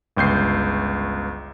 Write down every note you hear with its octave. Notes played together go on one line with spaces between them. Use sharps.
G1 C#2 G6 C7